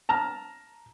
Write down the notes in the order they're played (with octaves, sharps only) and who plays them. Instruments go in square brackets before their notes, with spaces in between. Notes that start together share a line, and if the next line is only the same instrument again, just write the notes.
[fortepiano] A5 A#5 F6